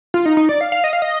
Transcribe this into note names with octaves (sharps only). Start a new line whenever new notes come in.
F4
D#4
D#4
D5
F5
F5
D#5
F5
D#5